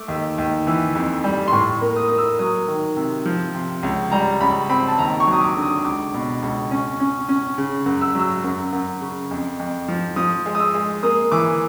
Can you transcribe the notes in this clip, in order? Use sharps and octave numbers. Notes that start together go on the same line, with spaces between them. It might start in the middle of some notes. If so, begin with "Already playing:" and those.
Already playing: A3 D6
D#2
D#2
E3
F2
G3
C6
A2 C#6
A#3
D#6
A#3 D#6
E6
F#3 D#6
D#3
C3
F3
C3
C#2
G3 A#5
C#2 B5
C4 B5
A5
D#2 A#5
C#6
F#3
D#6
D6
D3
D#6
C#2 D6
B2
C#2
C#4
C#4
C#4
C#3
F#2
E6
F#3 E6
F#2
F#2
C#3
F2
F2
F3
F3 D#6
G#3
D#6
E6
G#3
A#3 D#6
E3 D6